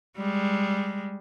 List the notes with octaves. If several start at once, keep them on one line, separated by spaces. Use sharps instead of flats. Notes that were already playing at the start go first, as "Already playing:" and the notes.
G3 G#3